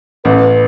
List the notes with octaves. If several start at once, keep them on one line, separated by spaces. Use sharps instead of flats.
A1 B4